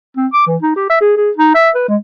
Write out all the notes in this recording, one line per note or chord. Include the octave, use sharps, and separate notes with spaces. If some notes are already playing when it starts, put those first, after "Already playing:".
C4
D6
E3
D#4
G4
E5
G#4
G#4
D#4
E5
B4
G#3